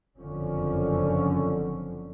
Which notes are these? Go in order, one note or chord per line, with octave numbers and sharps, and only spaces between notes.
F#1 F2 D3 F3 C#4